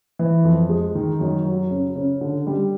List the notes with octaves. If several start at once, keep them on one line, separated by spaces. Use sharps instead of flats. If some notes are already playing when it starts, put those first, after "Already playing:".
E3
F2
G#3
D#3
F#2
F#3
C#3
C#3
D3
G3